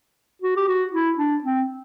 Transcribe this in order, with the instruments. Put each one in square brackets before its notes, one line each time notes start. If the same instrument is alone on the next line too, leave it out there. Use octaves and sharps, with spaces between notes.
[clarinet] F#4
G4
F#4
E4
D4
C4